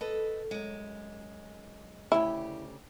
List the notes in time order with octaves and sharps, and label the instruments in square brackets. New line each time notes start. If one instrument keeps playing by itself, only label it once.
[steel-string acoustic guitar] A4 B4 D#5
F#2 G#3
[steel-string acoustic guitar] D2 C#3 G4 [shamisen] E4